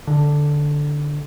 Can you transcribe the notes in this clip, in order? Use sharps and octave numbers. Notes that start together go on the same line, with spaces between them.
D3